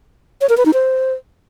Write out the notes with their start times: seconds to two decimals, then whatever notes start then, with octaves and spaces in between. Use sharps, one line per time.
0.41 C#5
0.49 A#4
0.57 B4
0.66 D#4
0.74 C5